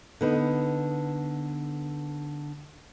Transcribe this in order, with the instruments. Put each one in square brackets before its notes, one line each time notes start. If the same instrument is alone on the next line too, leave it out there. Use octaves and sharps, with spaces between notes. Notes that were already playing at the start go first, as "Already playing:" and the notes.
[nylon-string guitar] D3 B3 D#4